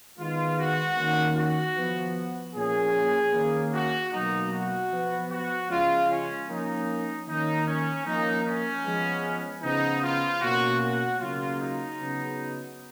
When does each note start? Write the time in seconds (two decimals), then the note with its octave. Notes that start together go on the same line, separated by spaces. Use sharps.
0.18 D#3 G#3 B3 F4
0.57 F#4
0.97 D#3 A#3 C#4
1.36 F#4
1.76 F3 B3
2.54 A#2 F3 A#3 C#4 G#4
3.32 D#3 A#3 C#4
3.72 F#4
4.12 B2 F#3 A#3 D#4
4.52 F#4
4.90 F3 B3
5.30 F#4
5.69 C#3 F3 G#3 C#4 F4
6.08 C#4
6.48 F3 A#3 C#4 D#4
7.26 D#3 A#3 C#4 D#4
7.66 C#4
8.05 F3 A#3 C#4 D#4
8.45 C#4
8.84 F3 G#3 B3
9.62 C#3 F3 B3 D#4
10.02 F4
10.41 B2 A#3 C#4 F#4
10.80 F#4
11.20 C#3 F#3 A#3 F4
11.59 D#4
11.99 C#3 F#3 B3